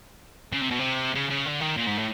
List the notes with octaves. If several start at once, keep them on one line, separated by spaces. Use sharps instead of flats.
C#3
C3
B2
C3
C#3
C#3
D3
D#3
A#2
G#2
A2